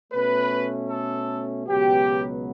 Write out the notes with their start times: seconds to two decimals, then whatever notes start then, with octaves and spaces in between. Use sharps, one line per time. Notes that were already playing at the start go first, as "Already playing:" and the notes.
0.12 B2 A3 C#4 B4
0.90 A4
1.67 C#2 B2 F#3 B3 G4